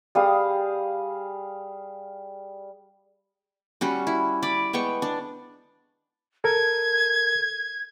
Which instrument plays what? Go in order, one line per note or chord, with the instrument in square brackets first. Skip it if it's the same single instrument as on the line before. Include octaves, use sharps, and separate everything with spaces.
[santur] G3 G#4 F5 D#6
[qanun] G3 C#4 F#4
E4
D5 B5
G#3 B3 G5 C#6
D4
[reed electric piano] A4 A#4 [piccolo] G#6